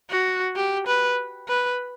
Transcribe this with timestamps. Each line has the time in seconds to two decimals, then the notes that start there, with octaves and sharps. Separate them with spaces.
0.11 F#4
0.56 G4
0.87 B4
1.48 B4